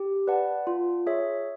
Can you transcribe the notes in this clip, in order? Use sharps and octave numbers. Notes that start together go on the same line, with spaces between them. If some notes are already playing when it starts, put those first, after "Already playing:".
Already playing: G4
B4 D5 F#5 A5
F4
G#4 C#5 E5